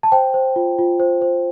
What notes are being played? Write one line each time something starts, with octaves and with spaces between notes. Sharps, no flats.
A5
C5 G5
C5
F4
F4
C5
C5